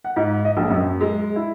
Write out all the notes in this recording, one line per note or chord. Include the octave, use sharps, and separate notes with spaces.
F#5
G#2
D#5
A#1
F#2
G#3
E4